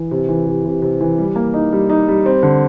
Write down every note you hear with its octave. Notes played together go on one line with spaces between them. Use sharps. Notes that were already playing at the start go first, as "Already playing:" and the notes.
Already playing: E3
C3
E3
C3
C3
C3
E3
G3
A#3
D#4
G3
D#4
G3
C4
D3